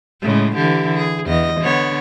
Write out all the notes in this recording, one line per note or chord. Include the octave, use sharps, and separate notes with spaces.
A2 C#3 G#3
D3 E3 G4
G#4
E2 D#5
D3 B3 C#5